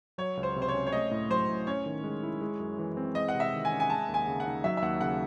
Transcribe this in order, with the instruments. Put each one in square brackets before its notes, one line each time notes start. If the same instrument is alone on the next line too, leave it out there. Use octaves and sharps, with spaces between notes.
[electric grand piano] F#3 [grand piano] C#5
[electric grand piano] C#2
[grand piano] C5
[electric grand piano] C3
[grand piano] C5
C#5
[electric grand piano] C#4
[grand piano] C#5
[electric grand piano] A3 [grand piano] D#5
[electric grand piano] A2
[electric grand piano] F#3 [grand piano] C5
[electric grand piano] A2
[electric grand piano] C#4 [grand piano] C#5
[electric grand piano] D#3
G#3
E4
G#3
F#2
E3
C4
[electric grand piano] G#3 [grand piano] D#5
[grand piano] F#5
[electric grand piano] C3
[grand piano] E5
[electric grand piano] D#3
[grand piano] G#5
[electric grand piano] C#4
[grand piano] G#5
[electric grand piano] G#3 [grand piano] A5
[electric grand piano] D#2
[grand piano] G#5
[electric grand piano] C#3
[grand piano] F#5
[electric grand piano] D#4
[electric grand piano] F#3 [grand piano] E5
[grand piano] E5
[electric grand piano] D#2 [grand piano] F#5
[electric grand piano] C#3 [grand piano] F#5